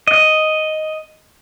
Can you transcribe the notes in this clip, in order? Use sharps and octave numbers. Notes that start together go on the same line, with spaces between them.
D#5